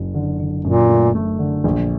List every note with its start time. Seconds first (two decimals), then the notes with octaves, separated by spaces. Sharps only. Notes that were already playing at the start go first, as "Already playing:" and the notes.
Already playing: F#1 F#2
0.14 D3
0.40 D3
0.65 F#2 A#2
0.89 A3
1.15 A3
1.39 D3
1.64 A#1